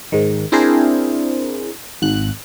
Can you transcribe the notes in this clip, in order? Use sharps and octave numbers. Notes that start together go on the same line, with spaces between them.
G#2 D#3
C4 D4 E4 G#4 A#4 C5
G#1 F#6